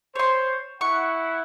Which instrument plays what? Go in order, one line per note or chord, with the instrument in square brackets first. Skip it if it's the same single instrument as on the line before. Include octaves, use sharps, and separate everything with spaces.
[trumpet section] C5 [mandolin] C#5 C6
[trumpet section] E4 F#5 [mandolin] C#6